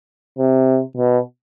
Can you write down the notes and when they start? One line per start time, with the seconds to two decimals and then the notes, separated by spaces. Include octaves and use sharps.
0.38 C3
0.97 B2